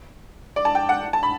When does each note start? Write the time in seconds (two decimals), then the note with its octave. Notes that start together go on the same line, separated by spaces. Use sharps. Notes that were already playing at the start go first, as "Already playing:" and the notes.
0.56 D5
0.65 A5
0.75 G5
0.89 F#5
1.13 A5
1.23 B5